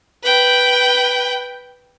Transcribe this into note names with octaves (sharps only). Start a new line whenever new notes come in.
B4 G5